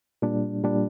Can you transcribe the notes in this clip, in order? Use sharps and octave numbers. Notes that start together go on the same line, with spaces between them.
A#2 G3 D4
A#2 G3 D4